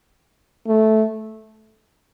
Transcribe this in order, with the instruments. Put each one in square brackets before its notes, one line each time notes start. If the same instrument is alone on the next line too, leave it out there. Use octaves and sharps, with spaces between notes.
[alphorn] A3